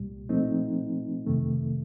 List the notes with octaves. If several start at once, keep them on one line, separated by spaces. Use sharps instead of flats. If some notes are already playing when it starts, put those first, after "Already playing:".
Already playing: C2 A#2 G3
A#2 F3 A3 C4 D#4
F2 C3 D#3 A3